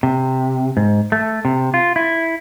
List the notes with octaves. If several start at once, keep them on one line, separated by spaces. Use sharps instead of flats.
C3
G#2
A3
C3
F4
E4